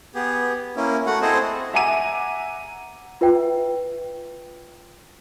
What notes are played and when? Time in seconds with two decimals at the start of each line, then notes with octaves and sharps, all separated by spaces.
0.15 B3 G4 G#4
0.76 A#3 C#4 E4
1.06 A3 F#4 F#5
1.22 C4 E4 G#4 A4 C5 D#5
1.74 E5 F#5 G#5 A#5 D6 D#7
3.21 F4 B4 E5 G5